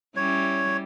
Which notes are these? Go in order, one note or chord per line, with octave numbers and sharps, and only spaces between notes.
G3 C#4 E4 C#5